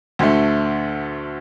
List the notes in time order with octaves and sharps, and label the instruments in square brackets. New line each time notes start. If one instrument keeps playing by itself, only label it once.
[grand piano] D2 D3 A3